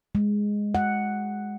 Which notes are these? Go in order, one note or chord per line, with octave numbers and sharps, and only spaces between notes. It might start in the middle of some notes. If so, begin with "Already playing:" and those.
G#3
F#5